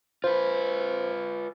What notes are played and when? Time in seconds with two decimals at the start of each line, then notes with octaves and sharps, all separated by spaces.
0.24 F4 B4 C5